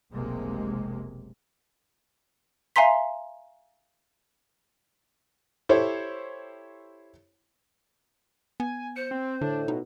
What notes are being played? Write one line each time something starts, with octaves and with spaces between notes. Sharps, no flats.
F1 B1 C3 G#3 A#3
E5 F5 G#5 A#5 C6 B6
E4 G4 A4 C5 C#5
B3 G#5
C5 C#7
C4
A2 D3 D4
B2 D#4